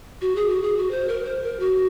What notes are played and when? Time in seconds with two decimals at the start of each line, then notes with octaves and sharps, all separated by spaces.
0.21 F#4
0.36 G#4
0.49 F#4
0.62 G#4
0.77 F#4
0.91 C5
1.08 A#4
1.25 C5
1.42 A#4
1.59 F#4